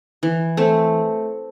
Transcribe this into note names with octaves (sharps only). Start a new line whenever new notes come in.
E3
A3 C4